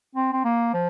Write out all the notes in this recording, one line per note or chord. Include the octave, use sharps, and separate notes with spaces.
C4
C4
A#3
F3